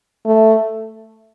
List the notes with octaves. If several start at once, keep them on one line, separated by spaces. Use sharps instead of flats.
A3